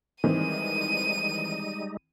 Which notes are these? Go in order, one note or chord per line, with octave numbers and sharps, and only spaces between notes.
D#3 E3 G3 G#3 C4 D#4 D#7